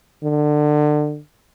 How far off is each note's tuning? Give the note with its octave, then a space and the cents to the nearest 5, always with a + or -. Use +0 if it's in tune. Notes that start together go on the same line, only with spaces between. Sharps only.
D3 +25